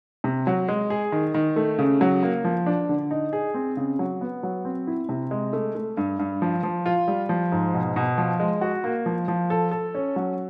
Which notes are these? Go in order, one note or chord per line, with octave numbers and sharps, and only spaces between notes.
C3
F#3
G#3
G#4
D#3
D#3
A3
C#3
F#3
A#3
F3
D4
D3
D#4
G#4
C4
C#3
F#3
B3
F#3
C4
E4
C3
G#3
A3
A3
G2
G2
F3
F3
F4
G3
F3
G#2
B2
B2
F3
G#3
F#4
A#3
F3
F3
A4
A4
C#4
F#3